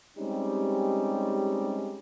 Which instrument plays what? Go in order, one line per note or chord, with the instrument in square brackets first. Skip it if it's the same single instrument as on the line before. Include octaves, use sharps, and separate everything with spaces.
[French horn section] G3 G#3 C4 C#4 D#4 G4